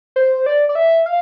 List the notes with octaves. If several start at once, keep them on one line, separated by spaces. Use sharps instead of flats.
C5
D5
D5
E5
F5